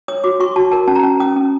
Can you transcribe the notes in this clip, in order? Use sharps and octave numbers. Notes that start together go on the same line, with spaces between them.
C#5 D#6
F#4 D6
F#4 C#6
F#4 A5
A#4 A5
C#4 A5
A#5
C#4 A5
C#4 D#6
C#4